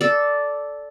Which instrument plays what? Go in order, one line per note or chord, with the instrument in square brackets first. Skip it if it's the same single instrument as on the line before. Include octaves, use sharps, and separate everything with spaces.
[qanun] A4 D5